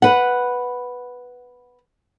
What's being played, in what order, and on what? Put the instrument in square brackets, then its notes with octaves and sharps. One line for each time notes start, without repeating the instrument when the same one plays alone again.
[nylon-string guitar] B4 F#5